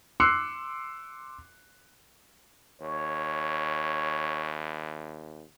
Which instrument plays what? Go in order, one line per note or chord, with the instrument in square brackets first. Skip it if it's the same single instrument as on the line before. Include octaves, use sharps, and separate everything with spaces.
[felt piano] C6 D6 E6 F#6 C7 C#7
[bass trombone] D#2 [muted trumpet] C#5